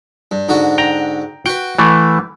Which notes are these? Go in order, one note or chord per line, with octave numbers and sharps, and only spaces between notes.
G2
G#2 D3 F#4
G5 A#5
F#4 B4 G5
E3 A3